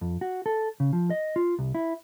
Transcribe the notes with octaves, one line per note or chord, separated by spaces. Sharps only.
F2
F#4
A4
C#3
F3
D#5
F4
C2
E4